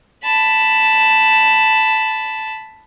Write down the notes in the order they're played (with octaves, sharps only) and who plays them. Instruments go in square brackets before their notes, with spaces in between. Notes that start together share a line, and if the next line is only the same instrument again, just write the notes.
[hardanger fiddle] A5 B5